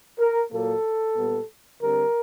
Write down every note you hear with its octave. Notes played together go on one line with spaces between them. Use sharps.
A#4
A#2 F#3 A#3 A4
A#2 G3 B3
D3 G3 C4 A#4